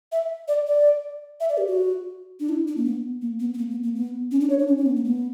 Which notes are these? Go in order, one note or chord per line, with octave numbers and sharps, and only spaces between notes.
E5
D5
D5
E5
D5
G4
F#4
D4
E4
D4
A#3
B3
A#3
B3
B3
A#3
B3
A#3
B3
C#4
D4
C#5
D4
C#4
D4
C#4
B3
A#3
B3